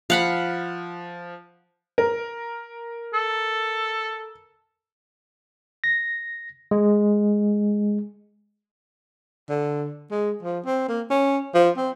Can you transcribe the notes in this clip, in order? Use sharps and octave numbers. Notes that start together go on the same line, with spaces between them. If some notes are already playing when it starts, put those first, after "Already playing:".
F3 F5 F#5 B5
A#4
A4
A#6
G#3
D3
G#3
F3
C4
A#3
C#4
F3
C4